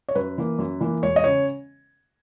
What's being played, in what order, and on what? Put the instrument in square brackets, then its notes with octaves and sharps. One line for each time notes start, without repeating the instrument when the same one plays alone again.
[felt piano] C#5
F#2 B4
E3 A#3
F#2
E3 A#3
E1 C#5
D#5
C#3 C#5